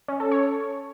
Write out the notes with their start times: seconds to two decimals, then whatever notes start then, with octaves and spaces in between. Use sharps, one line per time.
0.08 C#4
0.20 A4
0.32 C#5